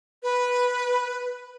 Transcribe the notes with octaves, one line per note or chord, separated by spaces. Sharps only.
B4